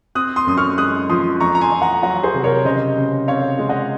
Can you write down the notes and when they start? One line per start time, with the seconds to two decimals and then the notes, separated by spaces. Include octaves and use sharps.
0.15 C4 D#6 F#6
0.36 C6 D#6
0.47 F#2 D#6
0.58 C#6 F6
0.77 G#3 D#6 F#6
1.10 F3 C6 D#6
1.40 F2 A#5 C#6
1.55 A#5
1.61 G#5 C6
1.72 F2
1.82 F#5 A#5
2.03 F#3 F#5 A#5
2.23 G#4 C5
2.34 C3
2.44 A#4 C#5
2.65 C#3 C5 D#5
2.97 C#3
3.28 C4 C#5 F5
3.59 G#3
3.69 D#5 F#5